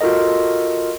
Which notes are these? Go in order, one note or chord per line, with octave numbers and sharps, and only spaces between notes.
F4 F#4 A4 A#4 D#5